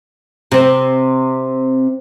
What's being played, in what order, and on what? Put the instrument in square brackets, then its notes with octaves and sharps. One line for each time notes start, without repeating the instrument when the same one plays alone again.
[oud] C3 C4